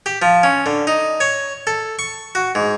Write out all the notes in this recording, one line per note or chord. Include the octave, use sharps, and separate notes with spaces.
G4
F3
C#4
D3
D#4
C#5
A4
C#6
F#4
G#2